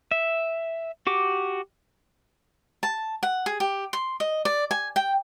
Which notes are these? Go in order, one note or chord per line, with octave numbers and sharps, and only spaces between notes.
E5
F#4 G4 D6
A5
F#5
G#4
G4
C6
D#5
D5
G#5
G5